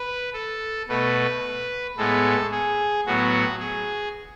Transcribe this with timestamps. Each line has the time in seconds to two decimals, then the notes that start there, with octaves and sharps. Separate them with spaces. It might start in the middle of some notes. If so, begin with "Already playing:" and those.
Already playing: B4
0.34 A4
0.88 B2 A3 B4
1.97 A2 G#3 B3 A4
2.52 G#4
3.06 A2 F#3 B3 F#4
3.60 G#4